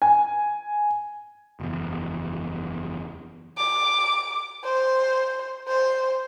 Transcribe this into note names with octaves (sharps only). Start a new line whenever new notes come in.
G#5
F#1 E2
D6
C5
C5